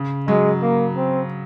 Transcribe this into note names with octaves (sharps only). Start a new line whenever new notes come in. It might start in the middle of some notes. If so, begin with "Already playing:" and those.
Already playing: C#3
F#3 G#3
A#3
C4